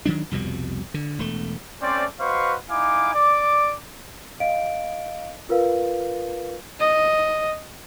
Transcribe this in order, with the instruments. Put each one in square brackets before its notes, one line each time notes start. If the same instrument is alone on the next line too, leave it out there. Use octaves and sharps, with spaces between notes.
[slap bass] D#3 F#3 D4
C2 F2 B2 G3
D3
E1 A3
[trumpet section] A3 C4 C#4 C5 D5
F#4 B4 C5 D#5 F5 C#6
D#4 E4 F5 G#5 D6
D5 D6
[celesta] D#5 F5 D7
F4 A#4 B4 F5
[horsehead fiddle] D#5